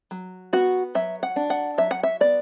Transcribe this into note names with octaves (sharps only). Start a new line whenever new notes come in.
F#3
B3 F#4
F#3 E5
F#5
D4
F#5
F#3 E5
F#5
E5
B3 D5